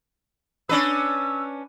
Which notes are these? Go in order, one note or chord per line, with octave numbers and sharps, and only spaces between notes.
C#4 D4 B4 E6